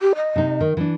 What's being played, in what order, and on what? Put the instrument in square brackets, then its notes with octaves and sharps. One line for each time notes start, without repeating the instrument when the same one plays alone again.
[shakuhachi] G4
D#5
[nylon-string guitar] C3 D#4
D#3
E3 D4